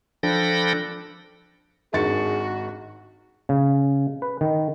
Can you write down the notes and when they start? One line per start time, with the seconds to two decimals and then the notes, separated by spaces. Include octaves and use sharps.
0.23 F3 D4 A4 G5 B5 A#6
1.94 G#1 D4 F#4 G#4 A6 C#7
3.49 C#3
4.22 B4
4.41 D#3